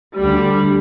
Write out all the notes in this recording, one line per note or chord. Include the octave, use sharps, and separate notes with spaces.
D2 D3 G3